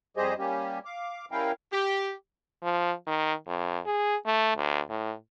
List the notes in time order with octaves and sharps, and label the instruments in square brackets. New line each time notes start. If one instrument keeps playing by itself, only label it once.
[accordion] F2 G3 G4 G#4 C5 D#5
G3 A#3 C#4 G4
F5 D6
G3 C#4 E4 A#4 F5 G5
[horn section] G4
[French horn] F3
D#3
F2
G#4
A3
D2
A2